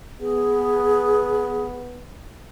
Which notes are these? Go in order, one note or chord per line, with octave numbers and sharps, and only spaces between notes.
B3 G#4